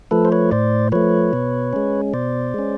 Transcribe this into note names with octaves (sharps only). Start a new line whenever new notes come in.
F3 A3 A4 B4
C5
B4 C#5
A2 C5 D5
F3 A3 B4 C#5
B2
G#3 C#4
B2 C5 D5
G#3 C#4